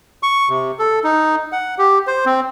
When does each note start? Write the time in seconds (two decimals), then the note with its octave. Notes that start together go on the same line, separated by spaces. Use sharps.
0.23 C#6
0.49 C3
0.79 A4
1.04 D#4
1.52 F#5
1.78 G4
2.07 C5
2.26 C4